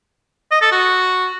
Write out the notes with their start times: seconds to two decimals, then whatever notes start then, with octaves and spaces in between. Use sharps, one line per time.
0.51 D#5
0.62 A4
0.72 F#4